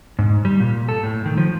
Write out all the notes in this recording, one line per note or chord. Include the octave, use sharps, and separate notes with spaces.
G#2
G3
A#2
A4
A2
D#3
F3